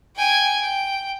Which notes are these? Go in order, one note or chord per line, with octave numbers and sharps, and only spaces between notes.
G5 G#5
G5